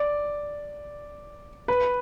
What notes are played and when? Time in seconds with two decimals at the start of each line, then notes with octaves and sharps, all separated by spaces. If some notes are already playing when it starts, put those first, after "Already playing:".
Already playing: D5
1.68 B4